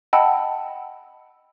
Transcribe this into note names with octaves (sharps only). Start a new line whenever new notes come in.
D#5 F#5 G5 A5 B5 E6